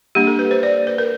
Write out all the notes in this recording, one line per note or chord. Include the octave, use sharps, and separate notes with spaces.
G3 A#3 D4 G4
A4
B4
C5
D5
B4
A#4